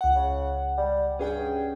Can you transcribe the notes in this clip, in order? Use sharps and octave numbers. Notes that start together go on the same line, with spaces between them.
C#2 F#5
C#3
G3
G2 C#4 G#4 G5